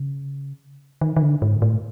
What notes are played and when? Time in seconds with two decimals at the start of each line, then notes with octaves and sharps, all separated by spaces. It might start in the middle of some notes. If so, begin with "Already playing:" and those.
Already playing: C#3
1.01 D#3
1.17 D#3
1.22 D3
1.42 G#2
1.62 A2